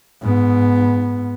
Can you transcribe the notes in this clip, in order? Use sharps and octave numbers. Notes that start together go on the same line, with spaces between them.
G#2 B3